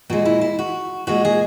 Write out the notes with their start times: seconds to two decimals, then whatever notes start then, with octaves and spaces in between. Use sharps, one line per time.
0.10 A#2 G#3 F#4
0.25 E4
0.41 E4
0.59 F#4
1.07 A#2 G#3 F#4
1.25 G#4